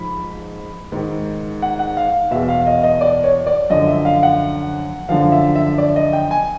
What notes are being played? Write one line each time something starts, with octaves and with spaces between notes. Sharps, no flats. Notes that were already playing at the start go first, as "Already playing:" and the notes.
Already playing: G#2 F3 B5
G#2 D#3
F#5
F#5
F5
E2 B2 E5
F5
D#5
D#5
D5
C#5
D5
F#2 D3 F3 D#5
E5
F5
F#5
F#2 D3 F3 F5
E5
E5
D5
D#5
G5
G#5